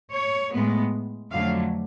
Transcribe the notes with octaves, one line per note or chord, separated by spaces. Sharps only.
C#5
A2 G#3 B3
F2 D3 F#3 A3 F5